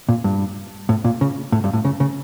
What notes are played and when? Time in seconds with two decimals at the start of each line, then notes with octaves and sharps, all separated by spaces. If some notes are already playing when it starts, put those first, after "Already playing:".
0.09 A#2
0.24 G2
0.89 A2
1.04 A#2
1.21 C#3
1.52 A2
1.64 G2
1.73 A2
1.85 C#3
2.00 C#3